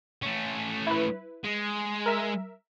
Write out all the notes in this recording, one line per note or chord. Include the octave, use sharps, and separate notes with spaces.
A3 C#4
E4 B4
G#3
A#4 E5